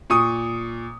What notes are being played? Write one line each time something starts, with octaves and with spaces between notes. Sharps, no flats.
A#2 C#6 D#6